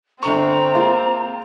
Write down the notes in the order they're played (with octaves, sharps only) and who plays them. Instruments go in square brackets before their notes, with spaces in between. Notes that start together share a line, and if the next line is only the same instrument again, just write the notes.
[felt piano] G1 D3 C#6 [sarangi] C4 [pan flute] A#5
[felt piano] G#3 A#3 F4